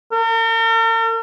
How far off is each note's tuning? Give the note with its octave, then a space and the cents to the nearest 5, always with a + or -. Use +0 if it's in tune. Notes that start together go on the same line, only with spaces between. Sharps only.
A#4 -45